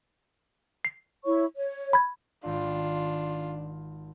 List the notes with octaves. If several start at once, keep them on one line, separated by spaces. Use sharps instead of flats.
C7
E4 C#5 C#6
C#5
B5 G#6
G#1 D#3 D4 F4